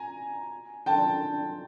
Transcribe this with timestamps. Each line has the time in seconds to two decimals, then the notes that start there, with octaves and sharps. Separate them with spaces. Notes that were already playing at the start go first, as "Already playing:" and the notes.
Already playing: G#5 A#5
0.86 G5 A5